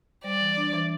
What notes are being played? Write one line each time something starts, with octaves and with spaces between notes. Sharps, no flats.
G3 D5
E3
D4
E3